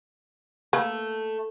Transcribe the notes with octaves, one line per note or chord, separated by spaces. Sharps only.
A3 A#3 B4